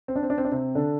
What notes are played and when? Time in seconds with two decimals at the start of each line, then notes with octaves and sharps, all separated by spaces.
0.08 C4
0.16 D4
0.23 C4
0.30 D4
0.38 C4
0.45 D4
0.52 C3 C4
0.75 D3 D4